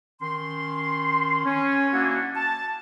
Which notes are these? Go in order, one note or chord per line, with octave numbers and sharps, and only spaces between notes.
D#3 C#4 C6
C#4
A#3 C#4 D4 E4 F#4
A5